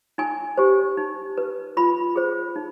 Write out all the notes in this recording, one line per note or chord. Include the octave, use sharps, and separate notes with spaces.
D#4 G#5
G4 C5
D#4
B4
F4 B5
G#4 C5
D#4